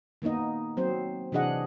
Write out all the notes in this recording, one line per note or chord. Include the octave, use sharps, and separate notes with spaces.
D#3 A#3 B3 D#4 D#5
F#3 C4 C5
C3 E3 D4 G#4 D#5 F#5